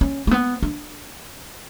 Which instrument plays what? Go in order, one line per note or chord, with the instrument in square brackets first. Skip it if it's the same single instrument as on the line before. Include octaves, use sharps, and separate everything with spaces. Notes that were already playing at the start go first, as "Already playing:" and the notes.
[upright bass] C#4
A3
B3
D4